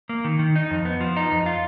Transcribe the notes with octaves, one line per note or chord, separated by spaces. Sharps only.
A#3
D#3
D#3
D#4
F2
B3
F3
D#4
F2
F4